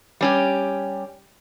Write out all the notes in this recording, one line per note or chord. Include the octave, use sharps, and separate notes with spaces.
G3 C#4 G4